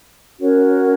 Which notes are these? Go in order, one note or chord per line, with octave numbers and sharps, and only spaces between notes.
C#4 F#4 A#4 C#5